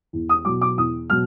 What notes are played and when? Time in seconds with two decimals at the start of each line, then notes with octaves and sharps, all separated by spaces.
0.13 E2
0.29 D#6
0.45 B2 F#3 D6
0.61 D6
0.77 E2 D#6
1.10 B2 F#3 F6